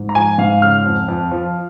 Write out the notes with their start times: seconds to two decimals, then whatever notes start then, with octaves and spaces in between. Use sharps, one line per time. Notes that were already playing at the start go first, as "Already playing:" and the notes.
Already playing: G#2
0.09 A#5
0.15 F3 G#5
0.38 G#2 F5
0.62 C#3 F6
0.86 F2
1.08 F2
1.31 F3